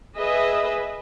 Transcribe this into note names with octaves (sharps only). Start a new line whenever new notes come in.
G#4 B4 D#5 E5